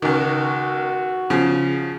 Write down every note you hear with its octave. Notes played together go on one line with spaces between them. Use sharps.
C#2 D#3 F#4
C#3 F3